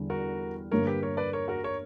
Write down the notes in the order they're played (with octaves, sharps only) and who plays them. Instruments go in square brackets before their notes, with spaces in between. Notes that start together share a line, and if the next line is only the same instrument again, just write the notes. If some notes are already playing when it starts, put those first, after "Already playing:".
Already playing: [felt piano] E2 D3 G3
[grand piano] F#4 A#4
[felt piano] G2 D3 A#3 [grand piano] A#4 C#5
[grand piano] G4 B4
A#4 C#5
B4 D5
A#4 C#5
F#4 A#4
A#4 C#5